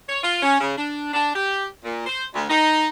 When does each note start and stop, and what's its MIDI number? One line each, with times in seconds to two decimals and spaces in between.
0.09 0.22 73
0.24 0.40 65
0.43 0.59 61
0.61 0.75 49
0.78 1.10 62
1.14 1.32 62
1.36 1.66 67
1.85 2.04 46
2.07 2.24 72
2.35 2.45 38
2.50 2.88 63